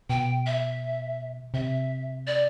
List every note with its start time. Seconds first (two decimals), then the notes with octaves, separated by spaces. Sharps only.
0.10 B2 G5
0.46 E5
1.54 C3 E5
2.27 D5